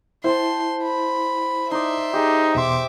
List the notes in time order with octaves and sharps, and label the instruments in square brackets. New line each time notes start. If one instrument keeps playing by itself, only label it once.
[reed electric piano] E4 [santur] C5 G5 A5 [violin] C6
[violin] B5
[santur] D#4 D5 [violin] E5 C6
[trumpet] D#4 [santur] G4 G#4
[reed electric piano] E2 B2 C6 [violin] E5 D6